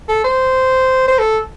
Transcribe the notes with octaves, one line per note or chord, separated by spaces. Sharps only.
A4
C5
C5
A4